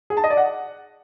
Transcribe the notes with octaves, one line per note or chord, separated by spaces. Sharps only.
G#4
A5
D#5
D5
F#5